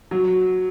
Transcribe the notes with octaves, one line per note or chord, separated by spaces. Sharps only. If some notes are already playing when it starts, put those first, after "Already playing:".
F#3